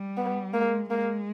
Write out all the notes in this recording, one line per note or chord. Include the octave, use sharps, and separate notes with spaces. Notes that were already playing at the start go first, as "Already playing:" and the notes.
Already playing: G3
B3
G#3 A#3
G#3 A#3